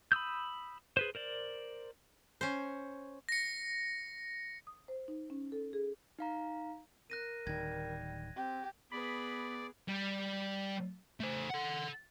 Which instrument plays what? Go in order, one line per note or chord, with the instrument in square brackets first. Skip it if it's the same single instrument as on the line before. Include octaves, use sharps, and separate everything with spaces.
[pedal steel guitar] B5 D#6 E6 G6
G#4 B4 C5
A#4 C5 D5
[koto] C#4 C5
[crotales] A#6 C#7
[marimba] D#6
C5
D#4
C#4
A4
G#4
[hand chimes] D#4 F5 A#5
[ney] A#4 [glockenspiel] F#6 A#6 D#7
[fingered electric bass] D1 D#3 [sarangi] G3 [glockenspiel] G#6 A#6
[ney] C4 [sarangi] G4
[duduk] B3 [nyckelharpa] G#4 B4 [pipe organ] D5 [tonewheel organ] B5
[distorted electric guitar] G3
A3 C5
A4 F#5